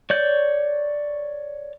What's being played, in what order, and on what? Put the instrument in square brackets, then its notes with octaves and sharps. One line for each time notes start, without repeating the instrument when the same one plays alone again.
[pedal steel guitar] C#5 D5 G6